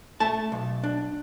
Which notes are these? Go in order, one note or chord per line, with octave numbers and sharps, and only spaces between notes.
A3 A5
B1
D4